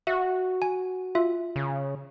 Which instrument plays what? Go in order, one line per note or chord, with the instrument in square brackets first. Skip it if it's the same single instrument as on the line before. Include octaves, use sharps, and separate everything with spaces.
[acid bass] F#4 [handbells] E5
[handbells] G#5
F4 E5
[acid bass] C#3